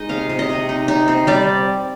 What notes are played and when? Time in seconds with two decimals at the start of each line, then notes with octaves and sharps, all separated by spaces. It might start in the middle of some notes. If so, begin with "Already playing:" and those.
Already playing: G#3 D#4 D#5
0.09 C3 F5
0.29 C3
0.39 D#5
0.49 C3
0.69 D#4
0.88 D#4
1.08 C4
1.27 G3 D5